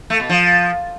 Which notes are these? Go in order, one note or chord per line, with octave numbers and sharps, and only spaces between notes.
A3
B2
F3